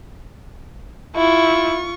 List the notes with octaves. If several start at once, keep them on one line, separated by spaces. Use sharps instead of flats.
E4 F4 C#6